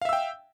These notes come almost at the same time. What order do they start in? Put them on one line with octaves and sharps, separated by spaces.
F5 E5 E6 G5